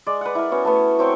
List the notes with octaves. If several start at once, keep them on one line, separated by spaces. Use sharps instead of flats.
G#3 D5
B4 F#5
E4 A#4
B3 C#4 F#4
A3 B3
F#3 C4 G5 C#6